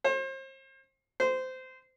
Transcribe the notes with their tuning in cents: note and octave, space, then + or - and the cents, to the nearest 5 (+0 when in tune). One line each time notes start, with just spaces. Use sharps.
C5 +35
C5 -20